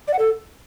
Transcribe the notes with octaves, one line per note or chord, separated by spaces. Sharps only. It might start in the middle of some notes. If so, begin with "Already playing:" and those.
D5
F#5
A4